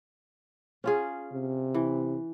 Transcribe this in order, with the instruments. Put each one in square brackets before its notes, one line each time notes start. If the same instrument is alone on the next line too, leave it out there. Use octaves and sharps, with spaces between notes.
[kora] C#4 F4 G#4
[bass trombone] C3
[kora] E3